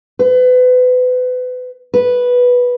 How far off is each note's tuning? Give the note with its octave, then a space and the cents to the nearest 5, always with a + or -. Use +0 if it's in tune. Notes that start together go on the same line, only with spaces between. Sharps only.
B4 +30
B4 -5